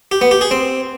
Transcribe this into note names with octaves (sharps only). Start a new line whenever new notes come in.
G4
B3
G4
G#4
C4